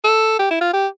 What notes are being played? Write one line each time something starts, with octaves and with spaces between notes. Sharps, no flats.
A4
G4
E4
F4
G4